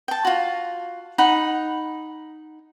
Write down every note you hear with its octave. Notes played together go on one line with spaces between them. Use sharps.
G5 A5
F4 F#4
D#4 F#5 B5